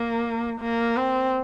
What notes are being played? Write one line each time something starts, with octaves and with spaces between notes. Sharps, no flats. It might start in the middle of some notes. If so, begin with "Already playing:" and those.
Already playing: A#3
A#3
C4